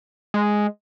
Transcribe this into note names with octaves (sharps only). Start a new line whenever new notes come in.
G#3